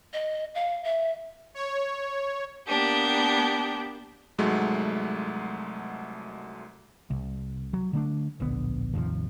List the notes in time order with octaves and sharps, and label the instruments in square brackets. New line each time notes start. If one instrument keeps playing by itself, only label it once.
[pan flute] D#5
F5
E5
[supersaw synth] C#5
[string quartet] A#3 B3 D4 G4
[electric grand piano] C2 G#2 F#3 G#3 A3
[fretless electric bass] C2
F#3
D3 A3 D4
D1 A#1 D3 B3
G#1 D#2 C3 F3